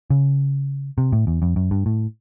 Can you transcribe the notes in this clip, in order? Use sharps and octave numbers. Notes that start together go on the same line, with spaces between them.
C#3
C3
A2
E2
F2
F#2
G2
A2